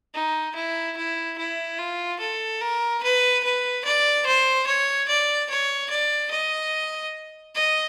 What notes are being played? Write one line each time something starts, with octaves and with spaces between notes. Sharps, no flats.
D#4
E4
E4
E4
F4
A4
A#4
B4
B4
D5
C5
C#5
D5
C#5
D5
D#5
D#5